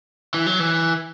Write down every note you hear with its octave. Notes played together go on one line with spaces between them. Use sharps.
E3
F#3
E3